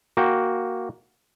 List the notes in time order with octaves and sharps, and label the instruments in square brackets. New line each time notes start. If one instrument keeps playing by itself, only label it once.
[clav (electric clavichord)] A#3 F#4 G5